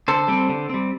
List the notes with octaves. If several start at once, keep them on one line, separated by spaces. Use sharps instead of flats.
D3 A4 C5
G3 C4
D3
G3 C4